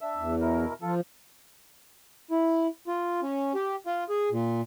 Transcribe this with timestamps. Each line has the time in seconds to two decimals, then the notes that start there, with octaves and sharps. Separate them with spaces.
0.01 D4 E5 E6
0.17 E2
0.41 B2 E4 A#4
0.82 F3 F4 A4
2.31 E4
2.87 F4
3.23 C#4
3.55 G4
3.86 F4
4.09 G#4
4.32 A#2